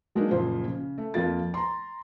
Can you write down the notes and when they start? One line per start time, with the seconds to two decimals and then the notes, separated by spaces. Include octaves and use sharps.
0.15 F#3 G#3 A#3 D4 D#4
0.31 F#1 A#2 F3 C5
0.67 C#3
0.98 A3
1.14 F2 A#3 F4 A6
1.54 A#5 C6